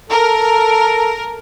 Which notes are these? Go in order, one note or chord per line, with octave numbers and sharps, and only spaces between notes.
A4 A#4